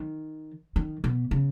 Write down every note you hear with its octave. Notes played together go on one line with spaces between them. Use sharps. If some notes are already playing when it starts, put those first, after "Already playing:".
Already playing: D#3
D#3
B2
C#3